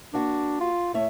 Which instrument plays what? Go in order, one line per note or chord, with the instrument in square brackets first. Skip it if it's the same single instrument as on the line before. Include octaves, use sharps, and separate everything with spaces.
[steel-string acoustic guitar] A#3 F#4 [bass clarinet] D4
[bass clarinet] F4
[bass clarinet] A2 [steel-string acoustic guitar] A3 C#5 E5